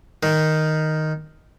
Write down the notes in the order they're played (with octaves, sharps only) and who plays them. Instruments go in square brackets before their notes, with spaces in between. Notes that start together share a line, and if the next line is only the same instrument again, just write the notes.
[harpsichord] D#3